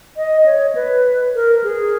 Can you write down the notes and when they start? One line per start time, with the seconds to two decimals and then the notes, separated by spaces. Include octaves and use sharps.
0.17 D#5
0.46 C#5
0.75 B4
1.35 A#4
1.64 G#4